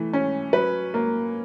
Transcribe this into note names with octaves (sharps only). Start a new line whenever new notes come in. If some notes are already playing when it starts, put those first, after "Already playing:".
Already playing: E3 A3
C#4
F#3 B4
A#3